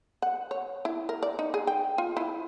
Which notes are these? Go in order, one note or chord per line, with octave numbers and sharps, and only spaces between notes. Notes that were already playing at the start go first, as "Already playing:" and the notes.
F#5
C#5
E4
A#4
D5
D#4
G#4
G5
F4
E4